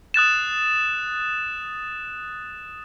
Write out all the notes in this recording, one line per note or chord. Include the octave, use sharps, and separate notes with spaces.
D#6 F#6 A6 E7